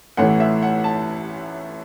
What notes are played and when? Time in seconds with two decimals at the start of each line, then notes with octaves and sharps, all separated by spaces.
0.17 A1 A2 E3 F#5
0.40 E5
0.62 F#5
0.84 A5